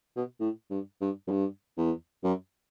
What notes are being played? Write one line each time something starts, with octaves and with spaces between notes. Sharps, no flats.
B2
A2
G2
G2
F#2
G2
E2
F#2